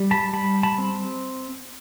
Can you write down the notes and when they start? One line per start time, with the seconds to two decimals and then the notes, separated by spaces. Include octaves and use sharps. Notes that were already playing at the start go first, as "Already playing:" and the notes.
Already playing: G3
0.11 A5 B5
0.33 G3 A5 B5
0.63 A5 B5
0.78 C4